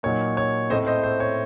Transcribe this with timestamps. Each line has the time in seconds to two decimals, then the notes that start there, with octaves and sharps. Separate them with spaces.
0.03 A#2 F#3 A#3 D#4 C#5
0.37 C#5
0.70 A2 A3 C4 C5 D#5
0.87 C5 D#5
1.03 C5
1.20 C#5